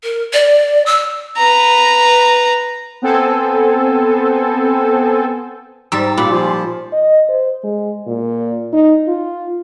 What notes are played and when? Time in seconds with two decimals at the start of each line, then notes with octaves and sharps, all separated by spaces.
0.03 A#4
0.33 D5
0.86 E6
1.37 B4 A#5
3.02 B3 C4 A4 C5 G#5
5.92 G#2 G3 A#5 E6 A6
6.17 A#2 F4 G4 F5 B5 D6
6.31 F3 G#5 C6
6.92 D#5
7.29 C5
7.64 G#3
8.06 A#2
8.73 D#4
9.08 F4